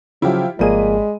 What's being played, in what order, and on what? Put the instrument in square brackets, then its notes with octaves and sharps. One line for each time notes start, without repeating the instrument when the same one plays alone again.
[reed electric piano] C#3 F#3 [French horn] F3 [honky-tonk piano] E4 F4 G4
[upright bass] G#1 [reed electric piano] F3 A#3 G#4 [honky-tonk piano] G3 D#7 [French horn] G#3